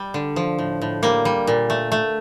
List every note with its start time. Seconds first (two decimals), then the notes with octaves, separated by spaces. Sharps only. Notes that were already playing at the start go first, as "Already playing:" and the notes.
Already playing: G3
0.14 D3
0.36 F3
0.59 A2
0.81 A2
1.03 G3 A#3
1.25 G3
1.47 A#2
1.70 A3
1.92 A3